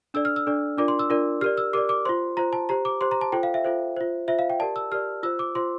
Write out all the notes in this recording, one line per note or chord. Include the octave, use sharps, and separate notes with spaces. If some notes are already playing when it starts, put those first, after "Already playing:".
D4 A4 D5 E6
F6
E6
D4 A4 D5
D4 F4 A#4 D5 D6
C6
E6
D4 F4 A#4 D5
G4 A#4 D5 F6
E6
G4 A#4 D5 D6
D6
F4 C5 C6
F4 C5 A#5
A5
G4 C5 A#5
D6
G4 C5 C6
A#5
A5
F4 A4 C5 G5
F5
E5
F4 A4 C5
F4 C5
F4 C5 E5
F5
G5
G4 A#4 D5 A5
E6
G4 A#4 D5 F6
F4 C5 E6
D6
F4 C5 C6